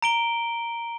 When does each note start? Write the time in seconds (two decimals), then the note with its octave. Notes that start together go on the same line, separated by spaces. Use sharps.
0.02 A#5 D7 G7